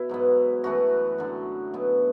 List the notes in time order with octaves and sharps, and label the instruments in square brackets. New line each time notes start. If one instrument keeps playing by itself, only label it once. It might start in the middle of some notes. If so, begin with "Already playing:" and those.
Already playing: [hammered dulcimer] B2 E4
G#2 F#3 B3
F#2 E3 A3 F#4
F#2 D3 F#3
B2 F#3 B3